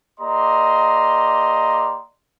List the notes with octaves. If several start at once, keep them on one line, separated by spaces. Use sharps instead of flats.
A#3 G4 D5 D#5 A#5 C6